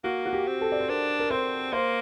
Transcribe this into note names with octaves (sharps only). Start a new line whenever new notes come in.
A#3 F#4
F#4
G4
C4
A4
D5
C5
D4 A#4
A#4
C4 C5
A#3 C5